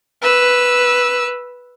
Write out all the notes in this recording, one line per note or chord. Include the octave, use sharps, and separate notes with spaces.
B4 E6